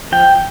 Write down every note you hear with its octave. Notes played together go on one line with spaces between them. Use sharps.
F3 G5